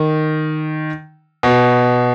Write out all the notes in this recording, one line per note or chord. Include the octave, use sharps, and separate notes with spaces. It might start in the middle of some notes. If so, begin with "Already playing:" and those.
Already playing: D#3
B2